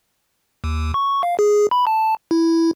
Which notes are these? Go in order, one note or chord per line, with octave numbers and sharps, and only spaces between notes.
D#2
C#6
F5
G#4
B5
A5
E4